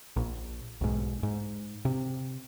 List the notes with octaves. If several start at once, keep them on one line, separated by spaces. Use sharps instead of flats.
A#1
B1 G#2
G#2
C3